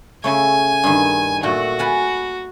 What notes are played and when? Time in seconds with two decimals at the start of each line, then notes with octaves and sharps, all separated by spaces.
0.24 C#3 A3 G#5
0.84 G2 D#3
1.43 A#2 A3 F#4
1.79 B4 G#5 A5